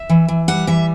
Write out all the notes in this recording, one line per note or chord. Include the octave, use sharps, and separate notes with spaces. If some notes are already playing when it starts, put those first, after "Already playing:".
Already playing: E5
E3
E3
G3 F#5
E3 E5